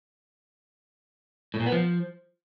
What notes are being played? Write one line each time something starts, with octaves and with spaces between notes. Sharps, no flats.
A2
A#2
B3
F3